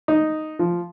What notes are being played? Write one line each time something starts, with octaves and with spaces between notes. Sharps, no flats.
D#4
F3